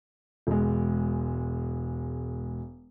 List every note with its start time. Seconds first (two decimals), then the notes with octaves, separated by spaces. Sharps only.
0.47 E1 G#3